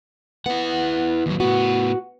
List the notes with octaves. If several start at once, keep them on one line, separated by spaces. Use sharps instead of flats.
B3 E4 F#5
D#2 F#3
A2 B3 F#4